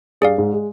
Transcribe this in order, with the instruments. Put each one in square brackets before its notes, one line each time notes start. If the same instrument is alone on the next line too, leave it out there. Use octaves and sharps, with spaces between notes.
[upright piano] G2 G3 [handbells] G#4 D5 F5
[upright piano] G#2 G#3
G#3